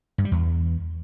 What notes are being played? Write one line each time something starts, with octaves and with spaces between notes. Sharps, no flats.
G2
G3
E2